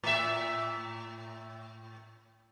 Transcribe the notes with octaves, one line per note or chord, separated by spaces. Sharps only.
A2 E5